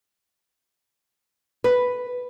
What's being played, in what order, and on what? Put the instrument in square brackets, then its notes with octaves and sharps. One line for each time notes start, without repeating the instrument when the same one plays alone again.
[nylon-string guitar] B4